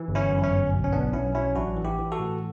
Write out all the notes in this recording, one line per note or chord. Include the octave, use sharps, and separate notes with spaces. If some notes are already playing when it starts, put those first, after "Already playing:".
Already playing: E3
G1
C#4 E4
F#2
C#4
G1
B1
C#4
B1 B3 D4
B1 C#4 E4
F#3 C#4 E4
A1 D4 F#4
E3
E4 G4
E3
F#4 A4
A2